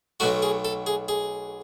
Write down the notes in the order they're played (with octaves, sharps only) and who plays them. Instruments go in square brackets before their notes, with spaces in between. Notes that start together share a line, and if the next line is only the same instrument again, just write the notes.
[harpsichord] B1 B2 F#3 A3 F#4
G#4
A4
G#4
G#4